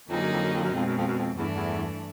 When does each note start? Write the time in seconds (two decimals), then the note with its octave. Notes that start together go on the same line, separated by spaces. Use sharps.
0.10 F2 D3 F#3 A#3 D#4 G#4
0.21 F#2
0.32 F2
0.43 F#2
0.54 F2
0.64 F#2
0.73 F2 B2 G#3 C4
0.86 F#2
0.98 F2
1.07 F#2
1.19 F2
1.37 E2 G2 E3 A3 D4
1.55 E2